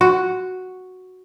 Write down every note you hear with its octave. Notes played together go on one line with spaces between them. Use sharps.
F#4